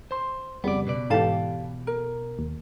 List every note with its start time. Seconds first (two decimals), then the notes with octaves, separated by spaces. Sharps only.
0.11 C5 C6
0.64 F2 C#3 G3 B3 D5
0.87 B2 B4 D5
1.10 G#2 E3 G4 A4 F5 A5
1.87 A#4
2.39 D#2